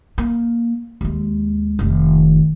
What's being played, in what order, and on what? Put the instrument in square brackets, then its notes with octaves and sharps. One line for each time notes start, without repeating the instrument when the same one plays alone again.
[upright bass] A#3
D#2 G#3
F1 D#3